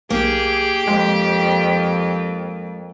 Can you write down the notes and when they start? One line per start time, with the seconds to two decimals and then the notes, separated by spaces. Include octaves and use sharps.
0.10 B1 A#3 G4 G#4 G5
0.87 F2 G#3